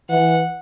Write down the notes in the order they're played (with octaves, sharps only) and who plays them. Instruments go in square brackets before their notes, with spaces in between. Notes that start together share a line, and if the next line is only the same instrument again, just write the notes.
[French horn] E3 [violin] F#5